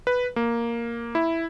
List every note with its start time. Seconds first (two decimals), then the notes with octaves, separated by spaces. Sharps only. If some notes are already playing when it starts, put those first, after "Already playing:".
0.07 B4
0.36 A#3
1.15 E4